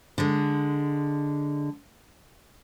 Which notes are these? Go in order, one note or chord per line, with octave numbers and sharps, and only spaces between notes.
D3 G#3